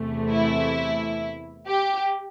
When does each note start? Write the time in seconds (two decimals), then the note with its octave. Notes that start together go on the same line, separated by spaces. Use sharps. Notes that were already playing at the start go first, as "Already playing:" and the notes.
Already playing: E2 C3 E3 A3
0.29 E4
1.66 G4